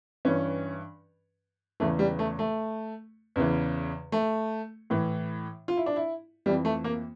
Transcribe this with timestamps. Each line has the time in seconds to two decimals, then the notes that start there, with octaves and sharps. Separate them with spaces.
0.25 G2 E3 C#4
1.80 E2 C#3 E3 A3
1.99 G3
2.19 A3
2.39 A3
3.36 E2 C#3 E3
4.12 A3
4.90 A2 E3
5.68 F4
5.77 E4
5.86 D4
5.96 E4
6.46 E3 G3
6.49 F2
6.65 A3
6.84 A#3